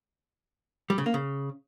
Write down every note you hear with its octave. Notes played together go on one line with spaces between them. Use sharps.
G3
C#3
A#3
C#3